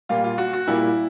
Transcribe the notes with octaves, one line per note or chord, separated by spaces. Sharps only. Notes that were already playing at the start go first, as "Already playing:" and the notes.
A#2 G3 A#3 F4
F4
F#4
F#4
A#2 G3 A#3 E4